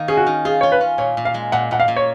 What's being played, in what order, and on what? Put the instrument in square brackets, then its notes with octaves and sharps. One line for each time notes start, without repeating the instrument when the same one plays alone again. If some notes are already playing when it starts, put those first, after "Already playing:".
Already playing: [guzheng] D#3 A#3
[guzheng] C#4 [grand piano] G#4
[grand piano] F#4
[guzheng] D#3
[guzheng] F4 [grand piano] G#4
[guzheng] F4 [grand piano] C#5
[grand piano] B4
[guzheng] C#4
[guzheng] A#2 [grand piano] C#5
[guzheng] A#2
[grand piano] F5
[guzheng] G#3
[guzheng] A#2 [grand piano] F#5
[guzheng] A#2 [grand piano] F#5
[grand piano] F5
[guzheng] A#2
[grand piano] C#5